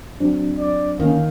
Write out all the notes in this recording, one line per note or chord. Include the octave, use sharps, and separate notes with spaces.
F#3 C4 D4
D5
D3 D#3 A#3 C#4 F5